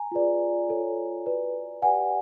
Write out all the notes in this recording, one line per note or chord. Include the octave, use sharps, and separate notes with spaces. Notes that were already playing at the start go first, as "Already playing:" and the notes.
Already playing: G#5 A#5
F4 G#4 B4 D5
F4 A4 C#5
F#4 B4 D5
G4 B4 D5 F#5 G#5